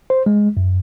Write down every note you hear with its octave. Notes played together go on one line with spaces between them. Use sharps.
C5
G#3
F#2